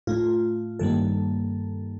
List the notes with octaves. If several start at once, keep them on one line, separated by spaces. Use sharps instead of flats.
A2 A3 F4
G2 D#3 G3 A#3 A4